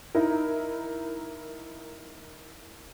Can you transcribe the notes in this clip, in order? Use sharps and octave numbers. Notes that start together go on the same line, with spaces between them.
D#4 E4 A#4